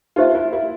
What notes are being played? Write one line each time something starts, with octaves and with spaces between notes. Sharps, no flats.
D#4 F4 G4 C5 E5
E4
E4